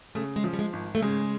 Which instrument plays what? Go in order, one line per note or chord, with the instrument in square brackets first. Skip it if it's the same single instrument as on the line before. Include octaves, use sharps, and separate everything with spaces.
[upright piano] C#3 [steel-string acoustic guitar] A3
[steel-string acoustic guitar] G#3
[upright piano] F3
[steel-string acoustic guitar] G3
G#3
[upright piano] G#1
[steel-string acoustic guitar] A3
[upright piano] C#3 [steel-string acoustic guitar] G#3